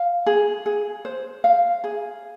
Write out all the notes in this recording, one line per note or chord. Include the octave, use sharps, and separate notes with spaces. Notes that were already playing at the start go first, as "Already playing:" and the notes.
Already playing: F5
G#4
G#4
C5
F5
G#4